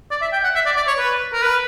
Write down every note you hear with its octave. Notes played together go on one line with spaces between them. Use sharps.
D5
E5
G5
F#5
E5
D5
D5
C#5
B4
A#4
B4